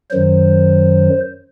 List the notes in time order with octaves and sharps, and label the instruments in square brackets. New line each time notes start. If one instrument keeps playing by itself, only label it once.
[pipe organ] F#2 D#3 F#3 C5